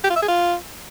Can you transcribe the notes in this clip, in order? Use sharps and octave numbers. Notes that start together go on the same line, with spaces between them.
G4
F4
E5
G#4
F4